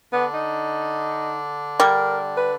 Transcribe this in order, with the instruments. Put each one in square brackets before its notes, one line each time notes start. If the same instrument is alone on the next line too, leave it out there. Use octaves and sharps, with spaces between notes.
[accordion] D3 D4 [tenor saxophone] B3
[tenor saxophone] D#4
[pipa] G3 [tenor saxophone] A#4
[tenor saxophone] B4